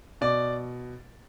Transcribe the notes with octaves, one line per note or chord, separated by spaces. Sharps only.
B2 D5